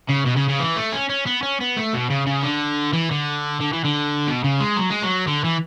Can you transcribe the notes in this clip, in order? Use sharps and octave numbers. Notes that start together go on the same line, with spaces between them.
C#3
B2
C#3
C#3
E3
A3
C#4
C#4
B3
C#4
B3
A3
B2
C#3
C#3
D3
E3
D3
D3
E3
D3
B2
C#3
G#3
F#3
G#3
F#3
D3
E3